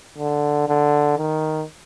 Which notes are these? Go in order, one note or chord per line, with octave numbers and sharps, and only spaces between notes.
D3
D3
D#3